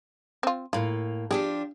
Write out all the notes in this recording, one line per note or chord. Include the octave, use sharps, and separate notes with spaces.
C4 F4
A2 A#3 F4
F3 D4 G4 G#4 G5